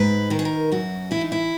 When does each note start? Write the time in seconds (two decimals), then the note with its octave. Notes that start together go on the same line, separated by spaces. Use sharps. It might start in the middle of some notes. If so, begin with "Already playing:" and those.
Already playing: G#2 B4
0.30 D#3 A#4
0.39 G#4
0.45 A#4
0.72 F#2 F#4
1.11 E3 E4
1.21 D#4
1.32 E4